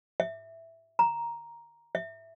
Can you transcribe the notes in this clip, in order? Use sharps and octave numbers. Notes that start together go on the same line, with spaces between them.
E5
A#5
E5